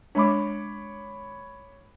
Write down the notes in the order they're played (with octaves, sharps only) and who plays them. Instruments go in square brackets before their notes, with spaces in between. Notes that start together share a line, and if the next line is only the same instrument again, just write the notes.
[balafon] G#3 D4 [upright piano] C#5 B5 D6